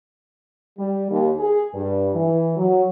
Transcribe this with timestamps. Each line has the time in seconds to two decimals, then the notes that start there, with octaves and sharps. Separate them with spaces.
0.78 G3
1.11 D#2
1.39 G#4
1.74 G2
2.14 E3
2.57 F#3